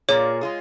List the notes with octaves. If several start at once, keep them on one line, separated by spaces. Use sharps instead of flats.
A#2 A#3 F4 G#4 C#5
G#3 F4 G#4